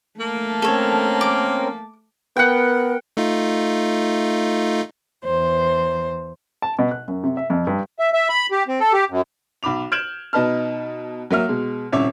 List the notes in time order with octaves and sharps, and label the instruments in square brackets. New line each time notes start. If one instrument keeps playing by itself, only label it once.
[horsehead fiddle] A3 A5 [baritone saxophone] A#3
[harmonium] C4 C#4 A#4 [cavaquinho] A4 C#5
[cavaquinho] D6
[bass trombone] B3 [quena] A#4 [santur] F#5 G5
[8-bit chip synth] A3 D#4 F4
[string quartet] E2 C5
[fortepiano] A5
B2
F#6
F#2
C3
E5
F2
G2
[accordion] E5
E5
B5
G4
C4
A4
G4
F#2
[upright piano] B1 B5 D6 F7
F6 G6 G#6 D7 E7 F#7
B2 D#4 B4 A5 F6
F#3 A#3 E5 F6
B2 G#3
D#1 C2 C#4 C#5 E5 D6